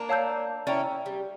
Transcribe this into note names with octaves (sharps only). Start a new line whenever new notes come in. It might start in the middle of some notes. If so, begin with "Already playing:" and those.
Already playing: A#3 D4
C#5 F5 A5 E6 G6
C#4 E4 D5 G5 A#5
G3